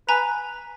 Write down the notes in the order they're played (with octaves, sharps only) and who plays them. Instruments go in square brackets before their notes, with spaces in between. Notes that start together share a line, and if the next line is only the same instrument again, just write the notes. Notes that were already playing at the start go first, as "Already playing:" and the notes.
[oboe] B4 [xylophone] G#5 A#5